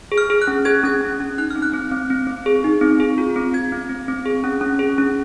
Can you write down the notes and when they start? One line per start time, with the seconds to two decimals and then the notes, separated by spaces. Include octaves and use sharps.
0.12 G#4
0.18 F6
0.30 G#4
0.42 F#6
0.47 C#4
0.65 G#4 G#6
0.84 C#4 G#6
1.01 C#4
1.20 C#4
1.38 D#4 F#6
1.50 F6
1.56 C4
1.62 F#6
1.73 C4
1.91 C4
2.10 C4
2.27 C4
2.46 G#4
2.64 D#4
2.81 C4
3.00 G#4
3.18 F4
3.36 C4
3.53 F4 G#6
3.72 C4
3.89 C4
4.08 C4
4.26 G#4
4.44 C#4
4.61 C#4
4.79 G#4
4.98 C#4